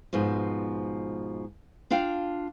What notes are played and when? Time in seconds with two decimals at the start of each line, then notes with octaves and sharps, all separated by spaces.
0.13 G#2 B2 F3
1.91 D4 F4 F5 G5